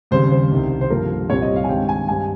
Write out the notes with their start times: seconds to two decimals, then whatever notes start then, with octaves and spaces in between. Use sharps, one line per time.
0.11 D#2 C#3 G3 C4 C5
0.31 C5
0.51 C2 C3 D#3
0.81 C5
0.90 G2 F3 A#3 A#4
1.29 C2 A#2 G3 C4 C#5
1.42 D#5
1.56 F5
1.64 G#5
1.69 G2 D#3 G#3 C4 G5
1.89 G#5
2.08 G2 G3 C4 G#5